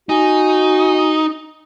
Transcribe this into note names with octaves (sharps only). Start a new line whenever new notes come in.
D#4 F#4 G#5